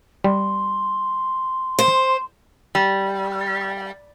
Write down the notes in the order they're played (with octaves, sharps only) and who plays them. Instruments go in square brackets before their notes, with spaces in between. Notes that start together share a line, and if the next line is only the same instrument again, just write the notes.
[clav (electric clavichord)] G3 [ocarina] C6
[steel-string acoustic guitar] C5
[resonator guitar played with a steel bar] G3